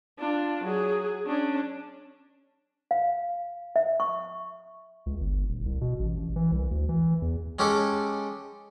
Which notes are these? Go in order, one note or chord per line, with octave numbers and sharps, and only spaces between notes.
D4 F4
F#3 G#4
C#4 D4
F5
E5
C#6
C#2
G1
D#1
C2
B2
A1
A1
E3
C2
D2
E3
E2
G#3 C#4 G4 A4 D6